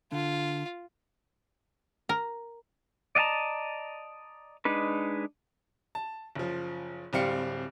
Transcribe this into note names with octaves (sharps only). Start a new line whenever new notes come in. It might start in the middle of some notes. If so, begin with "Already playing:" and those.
D3 F4
A#4
D5 D#5 F5 A5 A#5
G#3 D4 D#4 B4
A5
F#1 F3
D1 G3 C4 F5 C#7